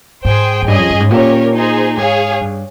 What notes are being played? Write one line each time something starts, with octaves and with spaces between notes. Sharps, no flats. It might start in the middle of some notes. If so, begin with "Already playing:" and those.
G#2 G#4 C5 G5
F2
G2 C#4 G#4 D#5 G#5
F2
G2
G#2
A#2 C#4 G4 A#4 C#5
D#4 G#4 C5
G#2 G#4 C#5 F5
G2